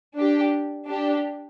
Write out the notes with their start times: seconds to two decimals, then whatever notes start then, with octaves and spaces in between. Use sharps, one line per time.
0.16 D4 G4
0.87 D4 G4